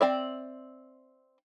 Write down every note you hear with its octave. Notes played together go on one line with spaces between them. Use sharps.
C4 D5 E5